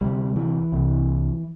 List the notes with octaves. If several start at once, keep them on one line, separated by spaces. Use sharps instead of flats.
D2 C3 G3
E3
C2 C3